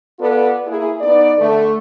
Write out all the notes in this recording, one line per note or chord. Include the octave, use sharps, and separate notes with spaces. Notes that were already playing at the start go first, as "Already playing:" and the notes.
B3 F4 A4 B4 D5
A#3 E4 G#4
B3 D#4 D5
D3 A3